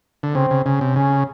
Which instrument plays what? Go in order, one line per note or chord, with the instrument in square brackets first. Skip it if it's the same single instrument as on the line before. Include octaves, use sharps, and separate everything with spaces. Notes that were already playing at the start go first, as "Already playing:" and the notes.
[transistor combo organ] D3
[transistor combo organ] C#3 [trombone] C4
[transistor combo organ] C#3
[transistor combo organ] C#3 [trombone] C#4
[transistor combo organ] C3
[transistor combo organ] C#3 [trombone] C#4